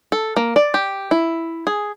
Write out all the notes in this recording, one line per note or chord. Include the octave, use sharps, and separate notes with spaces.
A4
A#3
D5
G4
E4
G#4